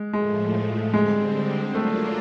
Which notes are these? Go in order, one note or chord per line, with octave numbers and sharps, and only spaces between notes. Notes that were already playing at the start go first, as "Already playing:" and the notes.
Already playing: G#3
A2 F3 G#3 A3
D3 G3 G#3 C4
F#3 A3 A#3 D4 F4